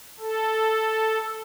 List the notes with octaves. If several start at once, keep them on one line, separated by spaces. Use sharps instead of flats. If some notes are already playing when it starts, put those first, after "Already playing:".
A4